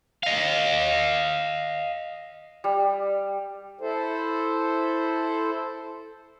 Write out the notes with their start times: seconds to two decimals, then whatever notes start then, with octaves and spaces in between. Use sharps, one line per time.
0.23 D#5 F5
2.64 G3
3.81 E4 A4 C5